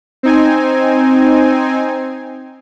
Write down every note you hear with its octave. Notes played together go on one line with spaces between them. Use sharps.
C4 D#4 G#5